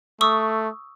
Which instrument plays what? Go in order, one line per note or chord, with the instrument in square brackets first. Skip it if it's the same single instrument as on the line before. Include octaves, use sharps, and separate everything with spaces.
[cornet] A3 [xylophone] C#6 D#6 E6